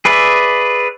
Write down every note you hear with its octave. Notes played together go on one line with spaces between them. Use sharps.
G#4 B4 D5 E5